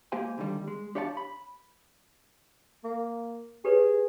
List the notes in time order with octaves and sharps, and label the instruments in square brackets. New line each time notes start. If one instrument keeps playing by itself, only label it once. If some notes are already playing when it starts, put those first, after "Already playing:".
[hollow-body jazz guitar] G#3 A#3 G4 C5 F5 G#5
C#2 D3 D#3 G3
G#3
D4 G4 C#5 F5 F#5 A5
B5
[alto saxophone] A#3
[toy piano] G4 B4 C#5 [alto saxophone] G#4